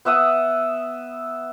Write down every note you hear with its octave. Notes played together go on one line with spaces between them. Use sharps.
B3 E5 F#5 D#6